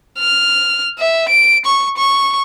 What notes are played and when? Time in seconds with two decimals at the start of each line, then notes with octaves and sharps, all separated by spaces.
0.19 F6
0.99 E5
1.29 D7
1.65 C#6
1.97 C#6